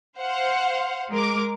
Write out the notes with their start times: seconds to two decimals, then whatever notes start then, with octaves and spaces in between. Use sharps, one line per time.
0.18 C5 F5 F#5
1.10 G#3 A#4 D6